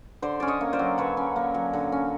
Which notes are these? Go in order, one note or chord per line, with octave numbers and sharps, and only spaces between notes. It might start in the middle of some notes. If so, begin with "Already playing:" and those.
D3 C5 D5
C#4 D5
C#5 D#5
A#3
C5 D5
F#3
D3 B4 C#5
C#4
A#3
F#3
D3
C#4